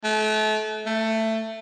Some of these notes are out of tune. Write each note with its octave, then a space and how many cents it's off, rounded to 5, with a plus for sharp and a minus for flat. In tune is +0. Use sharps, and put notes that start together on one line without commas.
A3 -35
A3 +15